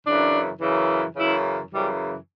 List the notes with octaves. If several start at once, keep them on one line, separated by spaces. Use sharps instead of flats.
F#2 C#3 E3 D4
F#2 C#3 E3
F#2 C#3 E3 E4
F#2 C#3 E3 G3